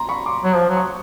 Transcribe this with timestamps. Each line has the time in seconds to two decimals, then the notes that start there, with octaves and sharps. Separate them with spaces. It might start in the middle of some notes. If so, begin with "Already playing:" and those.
Already playing: A#5 C6
0.09 B5 C#6
0.26 C6 D6
0.43 F#3
0.56 F3
0.69 F#3
0.77 C#6 D#6